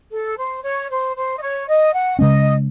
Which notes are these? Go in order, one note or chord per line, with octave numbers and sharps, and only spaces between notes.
A4
C5
C#5
C5
C5
D#5
C#5
D#5
F#5
C#3 G#3 C#4 D#5